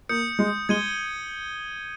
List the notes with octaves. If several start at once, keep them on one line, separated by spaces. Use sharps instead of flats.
A#3 D#6 G6 C#7
G#3
G#3 G#6 D#7 G7